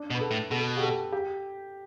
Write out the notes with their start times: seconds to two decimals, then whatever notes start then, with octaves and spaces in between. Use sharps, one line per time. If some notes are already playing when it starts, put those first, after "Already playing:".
Already playing: D4
0.10 B2
0.15 B4
0.21 A4
0.31 A2
0.51 B2 A4
0.77 G4
0.82 A4
1.12 G4